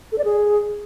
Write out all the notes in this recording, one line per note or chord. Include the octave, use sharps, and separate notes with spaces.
A4
D5
G#4